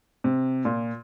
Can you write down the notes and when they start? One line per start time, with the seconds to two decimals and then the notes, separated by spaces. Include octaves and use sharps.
0.24 C3
0.65 A#2